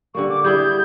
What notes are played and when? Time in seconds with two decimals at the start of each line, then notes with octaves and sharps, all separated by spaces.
0.15 D3 G3 A#3 C#6
0.29 D6
0.44 G3 B3 E4 G#4 G6